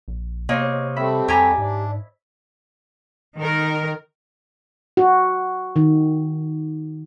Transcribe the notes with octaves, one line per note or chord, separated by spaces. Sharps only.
A#1
C3 A#3 C5 C#5 D#5
G3 A3 C4 E5 B5
F2 G4 G#5 A#5 G#6 B6
G#2 D4
D#3 A#4
F#4
D#3